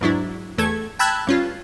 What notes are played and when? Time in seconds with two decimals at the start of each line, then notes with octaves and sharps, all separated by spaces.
0.01 E2 G#2 F#3 D4 E4
0.58 E2 A3 A4 G#6
0.99 G5 A5 B5 E6 F#6 G#6
1.27 G2 C#4 F4